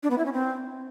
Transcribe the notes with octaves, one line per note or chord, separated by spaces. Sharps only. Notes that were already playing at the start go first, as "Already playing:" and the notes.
D4
B3
E4
C#4
C4